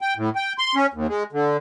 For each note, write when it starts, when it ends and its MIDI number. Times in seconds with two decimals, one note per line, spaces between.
0.01 0.14 79
0.17 0.30 45
0.36 0.53 79
0.58 0.75 84
0.75 0.86 61
0.93 1.07 39
1.08 1.23 56
1.32 1.57 50